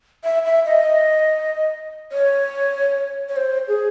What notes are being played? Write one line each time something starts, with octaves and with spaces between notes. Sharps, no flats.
E5
E5
D#5
C#5
C#5
C5
G#4